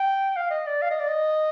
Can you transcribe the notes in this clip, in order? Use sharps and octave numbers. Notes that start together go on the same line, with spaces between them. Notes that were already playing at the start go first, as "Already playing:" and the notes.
Already playing: G5
F5
D#5
D5
F5
D#5
D5
D#5